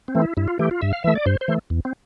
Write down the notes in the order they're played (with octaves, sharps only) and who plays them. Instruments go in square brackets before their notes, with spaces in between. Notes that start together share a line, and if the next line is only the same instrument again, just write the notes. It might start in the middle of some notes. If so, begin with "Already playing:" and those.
[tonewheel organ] C4
E3 A3
E4
G2 E4
F4
E3 A3 G4
F4
G2 E5
F5
E3 A3 E5
D5
G2 C5
C5
E3 A3
E2
C4